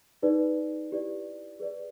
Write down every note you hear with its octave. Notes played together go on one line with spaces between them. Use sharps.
D#4 G#4 B4 D5
E4 G4 B4 D5
G#4 B4 D5